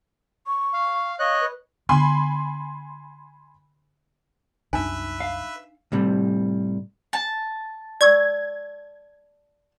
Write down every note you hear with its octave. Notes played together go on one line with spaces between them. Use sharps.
C#6
F5
C#5 D#5 F5 F#6
B4
D3 B3 G#5 B5 C6
C2 F#2 D4 D#4 B4 E5 G#5
F5
A2 C3 G3
G#5 A5
D5 C#6 E6 G#6